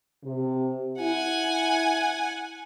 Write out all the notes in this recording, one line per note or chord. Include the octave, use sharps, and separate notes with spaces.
C3
E4 F#5 G#5